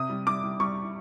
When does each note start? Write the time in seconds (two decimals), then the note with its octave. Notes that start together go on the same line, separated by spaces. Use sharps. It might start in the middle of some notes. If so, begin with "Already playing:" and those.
Already playing: C3 D#6
0.09 G3
0.26 G3 D6
0.44 G3
0.60 G3 C#6